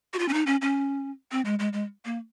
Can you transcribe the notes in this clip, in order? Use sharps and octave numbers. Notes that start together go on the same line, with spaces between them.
F#4
F4
C#4
D#4
C#4
C#4
C4
G#3
G#3
G#3
A#3